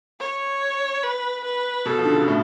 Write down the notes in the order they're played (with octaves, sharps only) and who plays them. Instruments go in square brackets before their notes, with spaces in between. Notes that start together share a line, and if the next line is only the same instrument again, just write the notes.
[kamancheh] C#5
B4
B4
[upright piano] B2 [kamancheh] A4
[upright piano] F3
D3
C#3
B2
A2